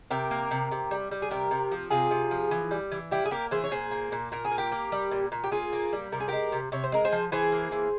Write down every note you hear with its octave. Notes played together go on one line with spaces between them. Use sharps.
C3 G4 A#4
A#3
C3
C3
G3
G3
G#4
C3 G4 A#4
C3
F3
C3 F4 G#4
C3
F3
E3
G3
E3
G3 E4 G4
G#4
A#3 G4 A#4
E3 G#4 C5
C#5
A#2 G#4 C5
A#3
A#2
A#2 A#4
G#4
A#3
G4 A#4
A#3
G3
A#2
A#2
G4
A#2 F4 G#4
A#3
G3
C3 A#4
G#4
G#3 G4 A#4
C3
C3 C#5
C5
G#3 A#4
G#4 C5
F3
E3 G#4 C5
A#3
E3